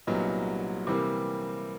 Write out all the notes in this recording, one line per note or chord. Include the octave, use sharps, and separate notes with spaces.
C2 A#2 F#3 B3 D#4
C3 E3 G3 A#3